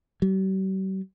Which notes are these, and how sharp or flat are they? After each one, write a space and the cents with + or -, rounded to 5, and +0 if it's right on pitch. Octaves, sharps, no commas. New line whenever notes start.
G3 -45